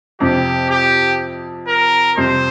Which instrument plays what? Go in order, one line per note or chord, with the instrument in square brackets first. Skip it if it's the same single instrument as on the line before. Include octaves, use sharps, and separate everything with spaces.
[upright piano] F2 C3 F3 [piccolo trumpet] G4
[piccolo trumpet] G4
A#4
[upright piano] F2 C3 G3 [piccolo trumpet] C5